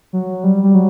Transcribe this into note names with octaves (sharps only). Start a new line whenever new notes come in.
F#3
G3
G3
F#3